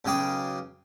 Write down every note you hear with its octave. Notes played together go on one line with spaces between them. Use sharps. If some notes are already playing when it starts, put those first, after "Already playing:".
B1 C#3 G#4 G5 D6